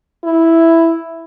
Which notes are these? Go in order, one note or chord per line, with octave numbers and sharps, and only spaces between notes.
E4